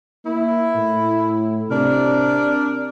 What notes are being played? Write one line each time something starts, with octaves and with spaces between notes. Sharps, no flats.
A#3 E4
A2
C3 D4 A#4 D5